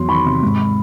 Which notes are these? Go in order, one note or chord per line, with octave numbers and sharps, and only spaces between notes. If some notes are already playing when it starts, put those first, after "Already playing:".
Already playing: E2 F#3 C6
D#3 B5 C#6
C3
G#2